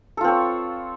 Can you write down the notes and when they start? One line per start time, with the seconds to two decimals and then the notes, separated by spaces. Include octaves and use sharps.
0.17 A4
0.21 F4
0.24 C4
0.28 C#5